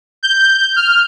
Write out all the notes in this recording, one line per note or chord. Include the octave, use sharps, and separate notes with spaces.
G6
F6